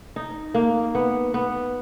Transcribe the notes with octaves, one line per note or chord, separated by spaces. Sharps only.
D#4
A#3
B3
B3